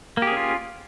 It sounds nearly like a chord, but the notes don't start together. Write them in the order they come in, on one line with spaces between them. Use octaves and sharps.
A#3 G4 G#4 C#4 F4